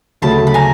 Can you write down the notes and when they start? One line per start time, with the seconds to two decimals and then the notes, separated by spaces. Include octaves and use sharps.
0.22 D2 C#3 F#3 A3 A5 B5
0.47 B5
0.54 G#5 A#5